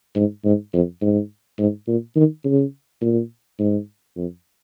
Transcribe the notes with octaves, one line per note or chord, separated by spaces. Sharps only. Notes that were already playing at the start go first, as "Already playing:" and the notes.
G#2
G#2
F2
G#2
G#2
A#2
D#3
C#3
A#2
G#2
F2